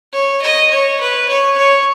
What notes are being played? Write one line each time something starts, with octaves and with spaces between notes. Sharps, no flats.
C#5
D#5
C#5
B4
C#5
C#5